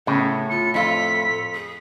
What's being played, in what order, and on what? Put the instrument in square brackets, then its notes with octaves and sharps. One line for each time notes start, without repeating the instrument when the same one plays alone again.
[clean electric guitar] A2 [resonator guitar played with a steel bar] C#3 [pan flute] B3
[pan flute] F4 [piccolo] C#7
[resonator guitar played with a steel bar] F2 F4 F5 [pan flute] A4 [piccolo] B6
[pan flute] G#4